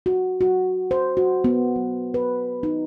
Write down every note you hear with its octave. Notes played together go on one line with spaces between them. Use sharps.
F#4
F#4
C5
F#4
B3
F#3
B4
D#4